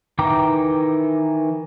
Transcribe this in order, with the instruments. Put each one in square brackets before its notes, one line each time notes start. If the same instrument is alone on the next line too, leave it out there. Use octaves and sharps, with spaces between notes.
[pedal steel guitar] D#3 E3 G5 A#5 D6